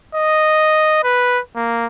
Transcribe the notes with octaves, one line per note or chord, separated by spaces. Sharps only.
D#5
B4
A#3